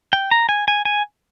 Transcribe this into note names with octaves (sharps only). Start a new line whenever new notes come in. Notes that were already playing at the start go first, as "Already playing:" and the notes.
G5
A#5
G#5
G#5
G#5